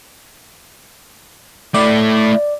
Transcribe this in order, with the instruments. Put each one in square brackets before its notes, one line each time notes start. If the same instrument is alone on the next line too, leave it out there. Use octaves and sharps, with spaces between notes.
[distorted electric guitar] A3 E4 [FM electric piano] D5